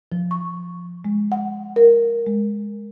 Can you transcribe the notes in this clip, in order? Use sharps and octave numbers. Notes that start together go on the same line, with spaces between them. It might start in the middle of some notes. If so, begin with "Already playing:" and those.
F3
C#6
G#3
F#5
A#4
G#3